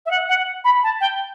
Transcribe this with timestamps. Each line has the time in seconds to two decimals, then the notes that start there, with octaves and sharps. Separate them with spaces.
0.06 E5
0.11 F#5
0.29 F#5
0.65 B5
0.83 A5
1.01 G5